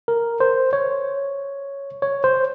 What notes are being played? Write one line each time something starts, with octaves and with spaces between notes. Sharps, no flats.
A#4
C5
C#5
C#5
C5